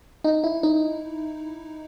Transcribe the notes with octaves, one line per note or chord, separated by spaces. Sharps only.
D#4
E4
D#4